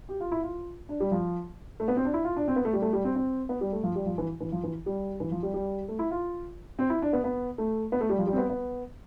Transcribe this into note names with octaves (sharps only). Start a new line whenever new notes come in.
G4
F4
E4
F4
D4
G3
F3
A3
B3
C4
D4
E4
F4
D4
C4
B3
A3
G3
A3
G3
C4
C4
B3
G3
A3
F3
G3
F3
E3
E3
F3
E3
G3
E3
F3
G3
G3
A3
E4
F4
C4
E4
D4
B3
B3
A3
B3
A3
G3
F3
G3
C4
B3
B3